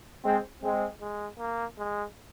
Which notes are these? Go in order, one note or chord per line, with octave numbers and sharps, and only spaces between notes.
G#3 C4
G#3 C4
G#3
A#3
G#3